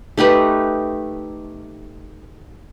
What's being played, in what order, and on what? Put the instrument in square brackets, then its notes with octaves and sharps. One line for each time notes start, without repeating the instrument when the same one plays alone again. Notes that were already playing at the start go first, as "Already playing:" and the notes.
[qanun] A3 D#4 G4 B4